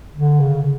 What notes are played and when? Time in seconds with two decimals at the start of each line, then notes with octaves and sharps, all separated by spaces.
0.15 D3
0.40 C#3